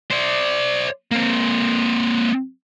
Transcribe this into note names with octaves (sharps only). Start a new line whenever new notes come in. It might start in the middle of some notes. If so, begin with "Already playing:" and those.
C5 D5
A#3 C4